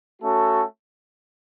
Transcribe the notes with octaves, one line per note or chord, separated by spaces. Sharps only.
A3 C#4 F#4 A4